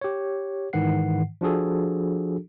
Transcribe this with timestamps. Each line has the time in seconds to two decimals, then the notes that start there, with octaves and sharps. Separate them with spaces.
0.01 G4 C#5
0.73 G#2 D#3 E3 F#5 C7
1.41 F3 D4 F#4 G#4 A4